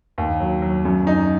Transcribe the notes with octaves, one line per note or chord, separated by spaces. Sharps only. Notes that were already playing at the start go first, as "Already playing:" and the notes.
D#2
F#3
F#3
F#2
D#4